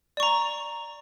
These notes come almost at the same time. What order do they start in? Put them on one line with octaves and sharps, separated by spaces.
D5 C#6 A#5